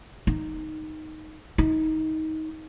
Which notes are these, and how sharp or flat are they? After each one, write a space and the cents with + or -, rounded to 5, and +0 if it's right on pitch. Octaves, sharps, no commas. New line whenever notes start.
D#4 +0
D#4 +20